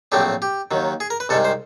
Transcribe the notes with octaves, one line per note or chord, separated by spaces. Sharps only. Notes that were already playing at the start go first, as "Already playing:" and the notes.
A#1 A2 F#3 A3 C4 G4
G4
D#2 D#3 F#3
G#4
A#4
B4
C2 C3 D#3 G#3 A4
C5